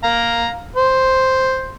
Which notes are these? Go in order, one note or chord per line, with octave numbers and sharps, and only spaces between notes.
F5 A#5
C5